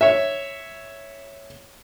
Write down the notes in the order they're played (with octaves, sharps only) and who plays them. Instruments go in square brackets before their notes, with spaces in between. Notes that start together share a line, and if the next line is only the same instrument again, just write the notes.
[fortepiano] C#5 E5